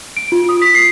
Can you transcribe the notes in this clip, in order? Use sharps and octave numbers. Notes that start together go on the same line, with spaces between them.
D7
F4
D#6
B6
C7